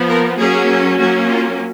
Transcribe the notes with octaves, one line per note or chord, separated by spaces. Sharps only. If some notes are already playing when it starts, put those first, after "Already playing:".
Already playing: F3 B3
A#4
F#3 A#3 C#4 G#4
F#3 A#3 C#4 F#4
F4